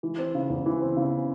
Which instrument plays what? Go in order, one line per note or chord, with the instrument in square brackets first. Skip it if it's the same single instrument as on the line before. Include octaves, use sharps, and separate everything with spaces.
[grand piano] E3
C4
C#3
E2
E3
C4
C#3